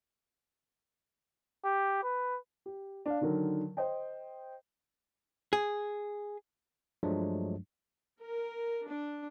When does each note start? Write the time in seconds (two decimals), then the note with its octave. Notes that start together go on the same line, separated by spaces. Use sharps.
1.64 G4
2.03 B4
2.66 G4
3.06 D4 F5
3.21 D3 D#3 F#3 A#4
3.77 C5 D#5 G5
5.53 G#4
7.03 G2 F3 F#3 G#3 A3 D4
8.23 A#4
8.88 D4